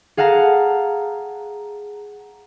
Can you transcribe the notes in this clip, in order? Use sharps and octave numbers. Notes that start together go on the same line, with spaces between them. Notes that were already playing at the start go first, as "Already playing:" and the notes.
G#4 F5 F#5 A5 A#5